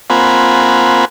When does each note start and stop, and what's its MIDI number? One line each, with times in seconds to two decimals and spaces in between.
0.10 1.05 58
0.10 1.05 60
0.10 1.05 65
0.10 1.05 78
0.10 1.05 80
0.10 1.05 83